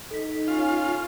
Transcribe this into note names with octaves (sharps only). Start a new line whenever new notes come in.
D#4 A4 B6
C#4 F4